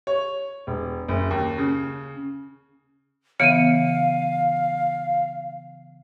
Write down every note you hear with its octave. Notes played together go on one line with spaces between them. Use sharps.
C#5
E1
F#1
D#2
C#3
C#3 E3 B3 F5 C#7 D#7